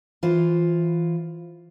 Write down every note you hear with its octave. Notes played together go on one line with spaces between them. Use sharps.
E3 F4 C5